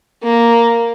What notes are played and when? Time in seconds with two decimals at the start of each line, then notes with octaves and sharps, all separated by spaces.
0.23 A#3